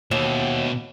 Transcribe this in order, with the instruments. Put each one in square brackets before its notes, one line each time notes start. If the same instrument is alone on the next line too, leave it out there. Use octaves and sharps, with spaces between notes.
[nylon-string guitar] D#2 [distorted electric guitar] B2 E5